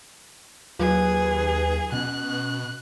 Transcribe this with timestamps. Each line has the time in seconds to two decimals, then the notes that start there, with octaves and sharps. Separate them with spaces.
0.79 D#2 F#3 F4 G#4 B4
1.92 B2 C#4 F#6